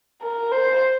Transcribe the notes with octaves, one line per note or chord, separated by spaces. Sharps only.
A#4
C5